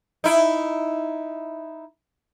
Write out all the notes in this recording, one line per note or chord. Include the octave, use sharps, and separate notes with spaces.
D#4 E4